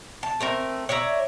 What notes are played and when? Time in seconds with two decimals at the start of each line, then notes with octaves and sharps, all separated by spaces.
0.23 A5
0.41 A3 C4 A#4
0.89 C#5 D5 E5 A#5